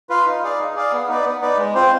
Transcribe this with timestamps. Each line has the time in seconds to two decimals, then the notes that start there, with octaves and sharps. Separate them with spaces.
0.10 F4 B4 F5
0.26 D#4
0.43 G#4 D5 F5
0.58 D#4
0.76 G#4 D5 F5
0.92 B3
1.09 D#4 B4 D5
1.25 B3
1.42 D#4 B4 D5
1.58 G#3
1.75 C4 F4 C5